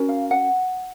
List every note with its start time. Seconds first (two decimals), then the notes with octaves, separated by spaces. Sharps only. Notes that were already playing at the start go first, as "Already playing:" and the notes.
Already playing: C#4 F#4 A#4
0.09 F5
0.31 F#5